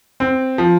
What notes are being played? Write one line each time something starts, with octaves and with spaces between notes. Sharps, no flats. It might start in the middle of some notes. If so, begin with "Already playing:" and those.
C4
F3